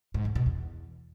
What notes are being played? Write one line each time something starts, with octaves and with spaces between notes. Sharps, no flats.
G#2
E2
B2
E2